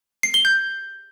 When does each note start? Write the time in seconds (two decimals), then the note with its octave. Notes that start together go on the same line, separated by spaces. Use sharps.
0.23 C7
0.34 G7
0.45 G6